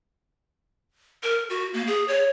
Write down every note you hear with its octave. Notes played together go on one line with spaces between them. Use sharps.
A#4
F#4
A#3
G#4
C#5